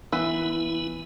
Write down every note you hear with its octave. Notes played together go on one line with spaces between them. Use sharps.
E3 B3 E4